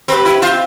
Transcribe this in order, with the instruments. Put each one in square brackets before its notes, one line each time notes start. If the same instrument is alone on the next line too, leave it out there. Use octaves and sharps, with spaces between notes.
[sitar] C4 [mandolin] G4 B4
[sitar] E4
[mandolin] C4 [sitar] F4